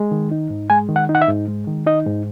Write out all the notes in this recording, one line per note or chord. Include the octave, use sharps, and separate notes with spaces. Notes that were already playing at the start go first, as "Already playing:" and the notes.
Already playing: G#3
D#3
D#4
G#2
G#3 G#5
D#3
F#5
D#4
F#5
E5
G#2
G#3
D#3
D#4 D#5
G#2